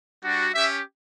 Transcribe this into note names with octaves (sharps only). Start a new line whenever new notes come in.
G3 D4 F#4
C#4 G4 E5